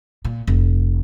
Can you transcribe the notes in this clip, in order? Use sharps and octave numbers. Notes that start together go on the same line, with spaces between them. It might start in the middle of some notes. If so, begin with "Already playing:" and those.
A#2
F1